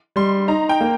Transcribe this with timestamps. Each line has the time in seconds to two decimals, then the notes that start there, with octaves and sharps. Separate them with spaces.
0.16 G3 C6
0.48 D#4 A#5
0.69 G5
0.81 A#3